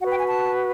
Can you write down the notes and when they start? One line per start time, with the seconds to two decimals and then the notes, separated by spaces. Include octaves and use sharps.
0.01 F#4 F#5
0.06 B4 G5
0.19 G#5
0.28 A5